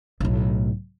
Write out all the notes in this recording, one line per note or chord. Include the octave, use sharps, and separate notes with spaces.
B1 A2